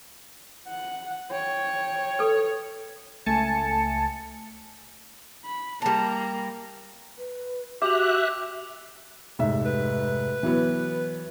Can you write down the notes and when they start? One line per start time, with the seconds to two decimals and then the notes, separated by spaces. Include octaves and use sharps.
0.68 F#5
1.32 C#5 G5
2.19 A4 B4
3.26 C#2 A3 G#5 A5 A6 C#7
5.45 B5
5.82 G3 A#3 A5 A#5
7.18 B4
7.82 F#4 G4 E5 D6 F#6 F7
9.39 F1 G#2 E5
9.65 B4
10.43 E3 F#3 B3